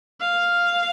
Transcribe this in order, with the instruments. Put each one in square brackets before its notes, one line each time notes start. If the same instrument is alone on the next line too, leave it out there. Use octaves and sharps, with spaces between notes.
[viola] F5